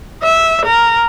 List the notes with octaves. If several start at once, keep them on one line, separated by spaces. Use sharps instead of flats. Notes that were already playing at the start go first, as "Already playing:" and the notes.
E5
A#4